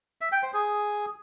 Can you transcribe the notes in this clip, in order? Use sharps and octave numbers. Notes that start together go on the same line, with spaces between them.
E5
G5
C5
G#4